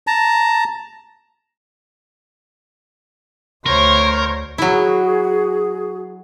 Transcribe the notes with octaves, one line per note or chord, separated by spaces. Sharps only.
A5 A#5
D2 A#4 C5 C#5
F#3 E4 F#4 G#4